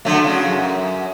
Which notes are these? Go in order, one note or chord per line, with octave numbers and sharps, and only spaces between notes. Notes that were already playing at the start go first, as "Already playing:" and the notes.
D3 F#3 A3
C#3 F#4
F#2